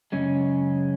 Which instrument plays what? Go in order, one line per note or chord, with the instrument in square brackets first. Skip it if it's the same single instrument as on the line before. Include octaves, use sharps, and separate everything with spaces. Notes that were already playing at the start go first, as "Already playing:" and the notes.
[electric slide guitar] F#2 C#3 G#3 C#4